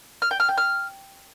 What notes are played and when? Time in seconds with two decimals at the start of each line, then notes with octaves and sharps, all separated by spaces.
0.22 F6
0.31 G5
0.40 F6
0.49 G5
0.57 F6